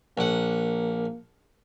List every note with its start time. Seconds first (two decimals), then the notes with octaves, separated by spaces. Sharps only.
0.18 A#1 A#3 F#5